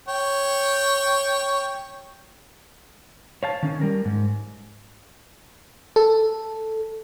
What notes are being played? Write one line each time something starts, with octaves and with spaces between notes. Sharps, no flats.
C#5 G5
C#5 F5 A5
D#3 C#4
G3 A#4
G#2
A4